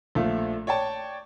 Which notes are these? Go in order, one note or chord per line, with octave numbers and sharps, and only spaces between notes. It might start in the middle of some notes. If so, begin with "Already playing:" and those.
A#1 F3 A3 F5
C#5 D5 G5 A5